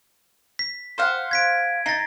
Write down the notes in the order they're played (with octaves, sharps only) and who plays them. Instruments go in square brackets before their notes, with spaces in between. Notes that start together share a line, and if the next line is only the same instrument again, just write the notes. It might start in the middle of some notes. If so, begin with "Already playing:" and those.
[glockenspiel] B6
[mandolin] C5 F5 F#5
[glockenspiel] G#6 B6 D7
[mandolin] D#4 [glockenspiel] A6 A#6 C7